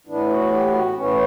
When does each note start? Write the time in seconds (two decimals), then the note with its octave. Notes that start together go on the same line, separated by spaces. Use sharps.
0.07 A2 E3 B3 D4
0.29 F#4
0.52 G4
0.74 F#4
0.96 A2 E3 B3 C#4